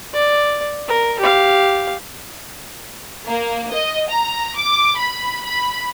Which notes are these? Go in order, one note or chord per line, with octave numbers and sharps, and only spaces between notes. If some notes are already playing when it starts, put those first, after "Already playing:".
D5
A#4
G4 F5
A#3
D#5
A#5
D6
B5
B5